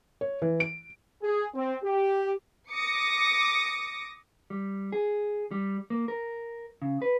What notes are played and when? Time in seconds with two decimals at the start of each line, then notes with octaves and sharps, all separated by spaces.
0.21 C#5
0.42 E3
0.60 D7
1.22 G#4
1.55 C4
1.83 G4
2.72 D6 D#6 A#6 C#7
4.50 G3
4.92 G#4
5.51 G3
5.90 A#3
6.08 A#4
6.82 C#3
7.02 B4